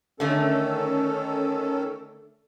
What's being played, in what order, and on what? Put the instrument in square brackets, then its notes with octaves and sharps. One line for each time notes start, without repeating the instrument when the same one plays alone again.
[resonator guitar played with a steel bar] D3 A3 [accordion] D#3 C#4 A4